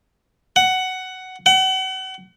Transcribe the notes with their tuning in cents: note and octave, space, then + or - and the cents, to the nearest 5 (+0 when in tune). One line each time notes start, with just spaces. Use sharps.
F#5 +10
F#5 +35